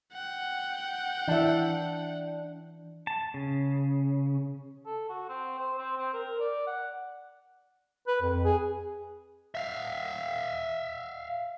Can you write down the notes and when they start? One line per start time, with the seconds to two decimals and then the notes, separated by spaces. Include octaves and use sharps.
0.13 F#5 G5
1.28 E3 D4 E5
3.07 A5
3.34 C#3
4.86 A4
5.10 F#4
5.28 C4
5.59 C5
5.78 C4
5.97 C4
6.14 A#4
6.40 D5
6.67 F#5
8.07 B4
8.22 F2
8.44 G#4
9.55 E5 F5